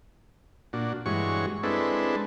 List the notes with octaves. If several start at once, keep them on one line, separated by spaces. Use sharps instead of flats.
A#2 D4 F#4
G2 E3 G#3 F#4 C#5 C#6
G#3 C4 D4 E4 A4 B4